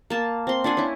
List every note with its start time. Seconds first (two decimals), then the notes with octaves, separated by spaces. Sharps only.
0.10 A#3 A5
0.47 C4 C6
0.64 D4 C5 F#5 G#5
0.77 C#4 E4